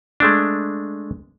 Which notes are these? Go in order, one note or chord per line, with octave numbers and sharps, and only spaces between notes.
G#3 A3 D4